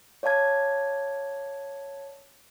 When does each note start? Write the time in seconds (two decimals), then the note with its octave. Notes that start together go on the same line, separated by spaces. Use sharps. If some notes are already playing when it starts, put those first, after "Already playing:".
0.23 C#5 D5 F5 A5 G#6